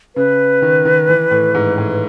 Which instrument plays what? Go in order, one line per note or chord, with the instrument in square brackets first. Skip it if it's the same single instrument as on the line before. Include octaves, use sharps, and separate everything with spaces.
[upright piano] C#3 [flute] B4
[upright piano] D#3
D#3
E3
A2
G#2
A2